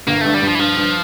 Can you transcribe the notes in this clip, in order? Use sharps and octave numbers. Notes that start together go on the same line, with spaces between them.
G1 A#3
G2 A3
G3
G2
F3
E3
G2 F3
G2